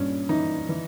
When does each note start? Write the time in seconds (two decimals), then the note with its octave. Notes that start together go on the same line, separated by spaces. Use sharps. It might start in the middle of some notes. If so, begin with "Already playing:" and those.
Already playing: G2 A#2 C#4
0.29 E3 D#4
0.69 E3